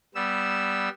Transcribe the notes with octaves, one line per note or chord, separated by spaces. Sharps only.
G3 B3 E6